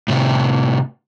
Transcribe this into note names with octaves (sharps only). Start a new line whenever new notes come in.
A2 C3